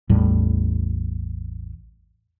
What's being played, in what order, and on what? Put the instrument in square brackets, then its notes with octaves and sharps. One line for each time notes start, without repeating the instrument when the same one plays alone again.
[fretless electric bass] A1 E2 A2 G3